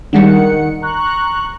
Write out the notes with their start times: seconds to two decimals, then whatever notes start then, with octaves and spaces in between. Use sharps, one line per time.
0.13 D#3 G3 G#3 D4 F#5 C#7
0.82 A#5 C#6 F#6